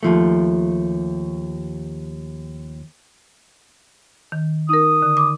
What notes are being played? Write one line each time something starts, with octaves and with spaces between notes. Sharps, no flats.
D#2 F3 A3
D#3
D#4 A#4 D#6
D3
D6